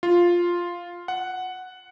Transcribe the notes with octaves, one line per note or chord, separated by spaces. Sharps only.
F4
F#5